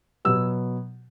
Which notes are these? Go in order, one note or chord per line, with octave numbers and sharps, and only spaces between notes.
B2 F#3 B3 E6